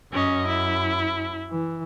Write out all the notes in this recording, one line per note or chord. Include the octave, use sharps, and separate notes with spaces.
F#2 C#4 D#5
E4
E3